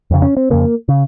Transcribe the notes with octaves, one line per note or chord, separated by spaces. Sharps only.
F2 C#3
C#4
C4
F2 C#3 A#3
C#3